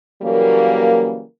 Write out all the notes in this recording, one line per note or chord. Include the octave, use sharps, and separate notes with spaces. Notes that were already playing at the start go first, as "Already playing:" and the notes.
C#3 E3 F#3 G3 A#3